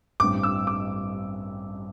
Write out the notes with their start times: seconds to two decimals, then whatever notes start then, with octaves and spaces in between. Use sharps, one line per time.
0.20 A1 G2 G3 C4 D6
0.43 E6
0.67 D6